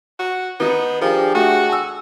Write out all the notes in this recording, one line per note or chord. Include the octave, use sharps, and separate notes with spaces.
F#4
D#3 B3 D#4
F3 D4 G4 G#4 A#4
A3 F#4
G#5 E6